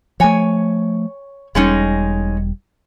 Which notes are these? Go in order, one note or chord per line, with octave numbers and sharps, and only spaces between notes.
F3 A3 C#5 G#5
E1 G3 G#3 C#4 D#4